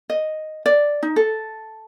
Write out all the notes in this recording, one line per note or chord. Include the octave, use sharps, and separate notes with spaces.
D#5
D5
D#4
A4